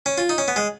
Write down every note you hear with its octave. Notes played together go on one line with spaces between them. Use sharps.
C#4
F4
D#4
C#4
B3
G#3